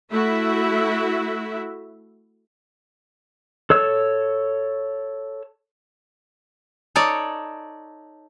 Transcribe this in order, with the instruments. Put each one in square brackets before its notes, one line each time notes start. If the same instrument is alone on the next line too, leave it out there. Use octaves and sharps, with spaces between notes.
[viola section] A3 E4 F#4 E5
[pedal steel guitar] A4 C#5 E6
[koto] D#4 A4 C#5 D5